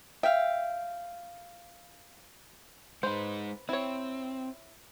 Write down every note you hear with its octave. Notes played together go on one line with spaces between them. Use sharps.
E5 F5 G5
G#3 D#4 B4 C5
C4 E4 C#5